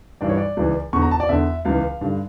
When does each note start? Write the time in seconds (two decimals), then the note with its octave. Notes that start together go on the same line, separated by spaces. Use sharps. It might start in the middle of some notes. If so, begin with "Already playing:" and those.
0.21 G2 E3 D5
0.29 C#5
0.37 D5
0.57 C#2 C#3 E3
0.93 E2 D3 C#6
1.02 A#5
1.11 A5
1.20 D5
1.29 E2 D3 E5
1.65 C#2 C#3 E3 F5
2.01 G2 D3